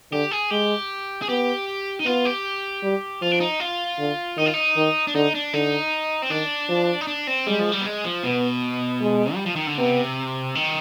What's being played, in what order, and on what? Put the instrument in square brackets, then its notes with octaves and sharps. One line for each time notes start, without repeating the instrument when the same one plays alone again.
[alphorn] D3 [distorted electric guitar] G4
[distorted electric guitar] G#4
[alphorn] G#3 [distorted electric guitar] G4
[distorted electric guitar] G#4
[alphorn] B3 [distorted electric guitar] G4
[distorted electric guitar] D#4
[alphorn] B3 [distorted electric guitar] F4
[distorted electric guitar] G4
[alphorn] G3
[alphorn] F3 [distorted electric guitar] F4
[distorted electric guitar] D4
D#4
F4
[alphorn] D3
[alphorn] D#3 [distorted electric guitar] D#4
[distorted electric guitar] F4
D#4
[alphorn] D#3
[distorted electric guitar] D4
[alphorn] D3 [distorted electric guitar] D#4
[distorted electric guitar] D4
[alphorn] D3 [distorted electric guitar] D#4
[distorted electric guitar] C4
[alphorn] D#3 [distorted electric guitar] D4
[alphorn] F3
[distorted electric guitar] D#4
D4
C4
[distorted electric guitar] G3 [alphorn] G#3
[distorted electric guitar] F3
G3
B3
G#3
F3
[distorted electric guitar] B2 [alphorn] B3
[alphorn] G#3
[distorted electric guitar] G3
F3
D#3
D3
[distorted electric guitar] C3 [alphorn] B3
[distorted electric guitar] D#3